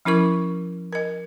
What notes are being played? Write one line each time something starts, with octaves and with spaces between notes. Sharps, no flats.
F3 C#4 E4 A#4 C#6
A#4 D#5